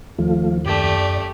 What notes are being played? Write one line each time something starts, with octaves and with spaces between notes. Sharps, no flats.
D#2 F3 A3 F4
F#2 A3 G4 D5